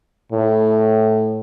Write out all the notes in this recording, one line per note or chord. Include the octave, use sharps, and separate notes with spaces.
A2